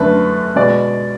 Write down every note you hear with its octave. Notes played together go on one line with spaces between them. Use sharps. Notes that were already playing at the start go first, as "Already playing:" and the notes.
Already playing: F#2 D3 A3 B4
B2 G#3 D5